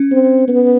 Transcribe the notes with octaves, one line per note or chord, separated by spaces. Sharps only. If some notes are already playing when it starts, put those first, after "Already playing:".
Already playing: C#4
C4
B3